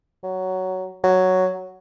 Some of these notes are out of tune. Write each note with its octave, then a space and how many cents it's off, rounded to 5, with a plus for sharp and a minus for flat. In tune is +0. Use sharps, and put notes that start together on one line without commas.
F#3 +10
F#3 +0